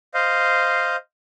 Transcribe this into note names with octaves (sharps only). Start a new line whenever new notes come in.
C5 D#5 F5